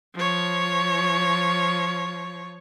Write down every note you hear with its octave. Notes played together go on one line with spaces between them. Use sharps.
F3 C#5